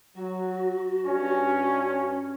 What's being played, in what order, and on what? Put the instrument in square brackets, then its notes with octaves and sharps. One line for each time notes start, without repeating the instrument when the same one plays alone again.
[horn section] F#3 [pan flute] F#4
[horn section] G2 C#4